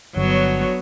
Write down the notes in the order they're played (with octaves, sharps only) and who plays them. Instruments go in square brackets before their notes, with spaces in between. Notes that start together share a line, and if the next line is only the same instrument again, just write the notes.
[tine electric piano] G1 [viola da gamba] F#3 B3 [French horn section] D4 F#4 C#5